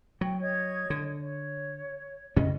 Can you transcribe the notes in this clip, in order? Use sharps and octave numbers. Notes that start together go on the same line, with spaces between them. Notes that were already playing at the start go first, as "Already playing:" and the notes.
F#3 G5
C#5 D#5 G#6
D3
C#5
F#2 C#3 C#4 D#5